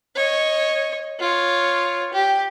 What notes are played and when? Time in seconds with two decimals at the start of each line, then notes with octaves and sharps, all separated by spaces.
0.16 C#5 D#5
1.19 F4 C#5
2.13 G4